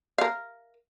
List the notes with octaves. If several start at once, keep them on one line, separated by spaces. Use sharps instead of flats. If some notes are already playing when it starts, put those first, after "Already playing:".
A#4 F5